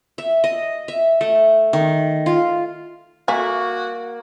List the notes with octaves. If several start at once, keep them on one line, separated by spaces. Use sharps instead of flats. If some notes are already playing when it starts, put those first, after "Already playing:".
E5
D#5
E5
A3
D#3
F4
A#3 F#4 E5 G#5 C#6